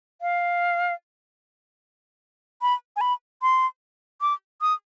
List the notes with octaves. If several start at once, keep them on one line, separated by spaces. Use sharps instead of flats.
F5
B5
G#5
B5
C6
D6
D#6